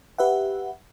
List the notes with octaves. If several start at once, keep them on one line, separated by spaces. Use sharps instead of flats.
G4 B4 E5 F#5